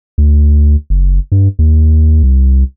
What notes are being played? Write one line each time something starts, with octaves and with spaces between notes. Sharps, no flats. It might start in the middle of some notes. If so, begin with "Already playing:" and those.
D2
F#1
G2
D#2
C2